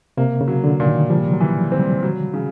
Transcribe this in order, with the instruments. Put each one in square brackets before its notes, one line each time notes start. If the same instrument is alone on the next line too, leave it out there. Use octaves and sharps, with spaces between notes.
[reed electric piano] C3 [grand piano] A#3
[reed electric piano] C#3
[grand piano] F#3
[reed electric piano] D3
[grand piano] A#2
[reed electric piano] D#3
[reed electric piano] F3 [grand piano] G3
[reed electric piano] F#3
[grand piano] E3
C4
[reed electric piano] G3
[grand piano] F#3
C#3